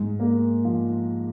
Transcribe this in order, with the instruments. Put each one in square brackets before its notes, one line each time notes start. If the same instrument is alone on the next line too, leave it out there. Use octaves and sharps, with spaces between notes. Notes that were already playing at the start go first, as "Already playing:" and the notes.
Already playing: [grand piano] G#2
A#3
F3